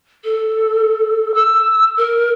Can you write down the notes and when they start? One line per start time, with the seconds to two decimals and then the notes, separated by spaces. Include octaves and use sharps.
0.24 A4
1.34 E6
1.97 A#4